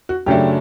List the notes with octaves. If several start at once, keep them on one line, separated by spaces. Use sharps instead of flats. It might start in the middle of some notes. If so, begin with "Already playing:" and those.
F#4
F#2 C#3 F#3 A3 D4 G4